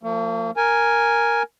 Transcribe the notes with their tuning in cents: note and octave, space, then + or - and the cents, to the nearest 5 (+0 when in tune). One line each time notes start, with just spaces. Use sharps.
F3 +0 A#3 -45
A#4 +0 G#5 +0